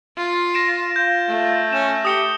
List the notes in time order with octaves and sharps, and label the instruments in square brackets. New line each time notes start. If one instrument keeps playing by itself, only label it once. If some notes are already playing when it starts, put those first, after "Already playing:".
[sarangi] F4
[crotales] A#6 D7 E7
[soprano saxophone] F4 [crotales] G6
[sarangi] A3
[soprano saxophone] C#4 [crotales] E7
[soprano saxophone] G4 [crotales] D#6 C#7 G7